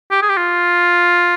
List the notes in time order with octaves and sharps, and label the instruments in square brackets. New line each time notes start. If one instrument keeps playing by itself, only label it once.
[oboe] G4
G#4
G4
F4